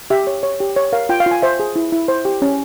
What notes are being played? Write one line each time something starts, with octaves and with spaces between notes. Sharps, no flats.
G4 E5
C#5
C#5
G4
C#5
A#4 F5
F4 G5
F5
F4 G#5
C5 E5
G#4
E4
E4
C5
G4
C#4